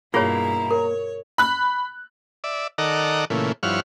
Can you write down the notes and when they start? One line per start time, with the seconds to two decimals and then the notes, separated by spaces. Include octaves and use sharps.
0.14 G2 B2 A#3 E4 F4 G#4 C#5 A#5
0.71 A#4 C#5
1.38 B5 F#6
2.44 D5 E5
2.78 D#3 A4 D5 D#5 F#5 A#5
3.30 A#2 C#3 E3 A3
3.63 G2 F3 E4 C#5 F#5 F6